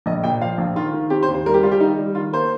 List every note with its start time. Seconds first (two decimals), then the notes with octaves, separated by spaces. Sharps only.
0.06 A#1 D#5
0.24 A#2 G5
0.41 F3 F5
0.58 A#1
0.76 D#3 F4
0.93 D#3
1.10 C4 G4
1.23 C5
1.28 D#2
1.34 C5
1.46 G3 A#4
1.54 G4
1.63 G3 F4
1.72 G4
1.80 D#3 D#4
1.98 G3
2.15 D#3 F4
2.33 A#3 C5